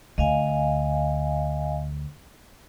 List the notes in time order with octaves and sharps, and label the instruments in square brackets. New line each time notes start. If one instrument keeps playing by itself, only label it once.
[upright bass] D2 [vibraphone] D#5 F5 G#5